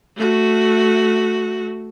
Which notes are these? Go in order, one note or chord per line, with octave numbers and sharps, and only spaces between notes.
A3 F#4